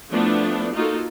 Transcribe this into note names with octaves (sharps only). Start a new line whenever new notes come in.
F3 A3 B3 D4 E4
A#3 D#4 F4 F#4 A4